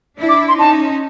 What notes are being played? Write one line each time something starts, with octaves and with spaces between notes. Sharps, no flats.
D4 E4
D6
C6
C#4 D#4 A5